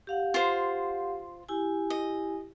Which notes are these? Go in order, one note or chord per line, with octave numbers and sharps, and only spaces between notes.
G4 F5 F#5
F4 C5
E4 G4 G#5
D#5